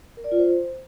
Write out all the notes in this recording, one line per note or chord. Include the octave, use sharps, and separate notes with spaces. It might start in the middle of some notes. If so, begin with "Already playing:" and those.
A#4
D5
F4
C5